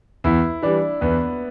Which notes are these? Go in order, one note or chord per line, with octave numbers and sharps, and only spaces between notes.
E2 E4
E3 G3 D4
E2 B3